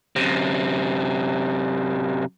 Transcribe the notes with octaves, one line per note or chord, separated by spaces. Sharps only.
F#2 C3